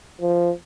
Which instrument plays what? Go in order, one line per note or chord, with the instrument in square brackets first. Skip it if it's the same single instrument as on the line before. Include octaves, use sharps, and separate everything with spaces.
[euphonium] F3